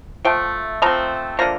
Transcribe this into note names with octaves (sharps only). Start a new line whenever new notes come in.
F3 A3 G5
F3 A3 C4 A#5
D3 F3 A#3 A#5